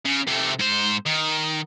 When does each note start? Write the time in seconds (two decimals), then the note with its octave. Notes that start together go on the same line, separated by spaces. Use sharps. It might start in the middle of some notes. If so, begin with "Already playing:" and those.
0.05 C#3
0.28 C3 A3
0.59 G#2 C5
1.06 D#3